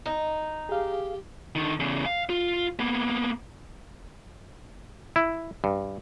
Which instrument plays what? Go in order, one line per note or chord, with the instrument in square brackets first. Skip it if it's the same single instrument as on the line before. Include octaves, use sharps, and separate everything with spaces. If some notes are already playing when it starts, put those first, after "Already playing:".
[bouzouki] D#4
[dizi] G4 [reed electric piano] G#4 F5
[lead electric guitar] D3 D#3
E2 C#3
F5
F4
A#3 B3
[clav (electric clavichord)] E4
G2